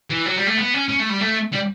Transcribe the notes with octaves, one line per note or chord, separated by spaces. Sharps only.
E3
F#3
G3
A3
B3
C#4
C#4
A3
G3
A3
G3